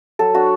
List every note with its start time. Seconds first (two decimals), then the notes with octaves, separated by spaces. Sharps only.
0.19 F#3 A4
0.34 D4 F#4